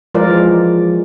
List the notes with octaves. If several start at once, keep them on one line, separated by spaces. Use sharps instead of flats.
E3 F3 G#3 F4 A#4 D5